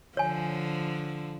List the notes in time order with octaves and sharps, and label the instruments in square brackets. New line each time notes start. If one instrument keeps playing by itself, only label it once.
[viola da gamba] D3 F3 [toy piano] C#5 G#5